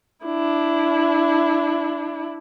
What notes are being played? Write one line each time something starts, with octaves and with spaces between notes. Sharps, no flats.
D4 E4